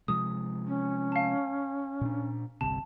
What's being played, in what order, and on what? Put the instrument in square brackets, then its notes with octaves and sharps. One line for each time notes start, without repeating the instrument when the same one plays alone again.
[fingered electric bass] C3 F3 G#3 [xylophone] D#6
[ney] C#4
[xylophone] F5 A5
[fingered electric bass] A#2 D4
[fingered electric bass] G1 C2 C3 [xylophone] A5